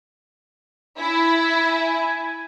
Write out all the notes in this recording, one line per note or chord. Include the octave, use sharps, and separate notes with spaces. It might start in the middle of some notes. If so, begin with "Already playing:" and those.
E4 G#5